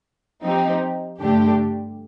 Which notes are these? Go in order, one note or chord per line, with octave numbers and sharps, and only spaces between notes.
F3 C4 D#4 G4
G2 D3 A3 D4 G4